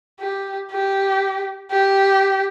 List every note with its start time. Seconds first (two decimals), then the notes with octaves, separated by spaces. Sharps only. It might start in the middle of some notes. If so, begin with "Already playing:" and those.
0.20 G4
0.71 G4
1.71 G4